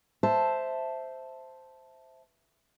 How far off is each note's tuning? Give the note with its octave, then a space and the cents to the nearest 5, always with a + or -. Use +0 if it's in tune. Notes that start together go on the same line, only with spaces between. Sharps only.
C5 -5 E5 +0 A5 +0